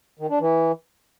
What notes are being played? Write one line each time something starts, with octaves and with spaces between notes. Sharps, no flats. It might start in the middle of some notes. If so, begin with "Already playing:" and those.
D#3
D4
E3